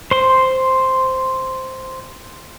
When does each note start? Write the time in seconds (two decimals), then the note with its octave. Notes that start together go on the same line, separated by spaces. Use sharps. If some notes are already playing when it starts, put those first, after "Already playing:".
0.11 C5 C6